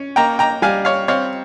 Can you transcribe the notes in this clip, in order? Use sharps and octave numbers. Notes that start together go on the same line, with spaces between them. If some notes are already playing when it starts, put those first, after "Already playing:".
Already playing: C#4
A#3 G5 A#5
G5 A#5
G3 F5 G#5
C#5 F5
C4 C#5 F5